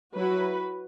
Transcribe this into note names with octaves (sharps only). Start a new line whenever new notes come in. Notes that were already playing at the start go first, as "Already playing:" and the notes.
F#3 E4 F#4 B4